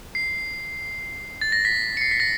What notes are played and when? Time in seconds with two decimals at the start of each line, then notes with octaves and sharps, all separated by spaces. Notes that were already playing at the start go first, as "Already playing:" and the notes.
0.15 C7
1.41 A6
1.52 A#6
1.65 B6
1.97 C#7
2.01 C7
2.11 B6
2.20 A#6